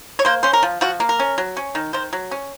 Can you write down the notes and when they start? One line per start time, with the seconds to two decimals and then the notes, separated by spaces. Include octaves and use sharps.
0.19 C#5
0.25 A#3 C5
0.43 C#4 C5
0.53 A#4
0.63 F3
0.81 F3 F#4
1.00 A#3
1.09 A#4
1.20 C#4
1.38 F#3
1.57 C#4
1.75 D#3
1.93 D#3 C5
2.13 F#3
2.31 C#4